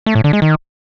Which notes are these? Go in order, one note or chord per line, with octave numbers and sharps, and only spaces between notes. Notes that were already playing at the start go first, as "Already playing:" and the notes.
A3
A2
D3
G#3
D#3